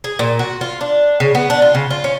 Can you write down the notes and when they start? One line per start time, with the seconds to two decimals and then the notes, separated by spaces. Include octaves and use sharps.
0.04 G#4
0.19 A#2
0.39 F#4
0.61 F4
0.81 D4
1.20 C#3
1.35 B3
1.50 D4
1.62 F4
1.75 C#3
1.90 F4
2.04 C#4